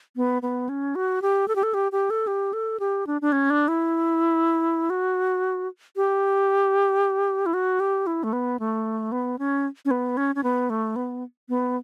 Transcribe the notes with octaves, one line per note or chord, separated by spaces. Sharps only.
B3
B3
C#4
F#4
G4
A4
G4
A4
G4
G4
A4
G4
A4
G4
D4
D4
C#4
D4
E4
F#4
G4
E4
F#4
G4
E4
A3
B3
A3
B3
C#4
C#4
B3
C#4
C#4
B3
A3
B3
B3